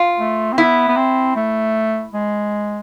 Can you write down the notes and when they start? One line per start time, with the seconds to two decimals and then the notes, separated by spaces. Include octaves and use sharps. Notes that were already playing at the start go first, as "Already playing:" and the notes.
Already playing: F4
0.19 A3
0.53 C4
0.57 B3 E4
0.88 B3
0.97 C4
1.36 A3
2.14 G#3